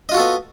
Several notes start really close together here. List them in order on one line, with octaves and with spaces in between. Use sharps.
D#5 F4 F#4 A4 B3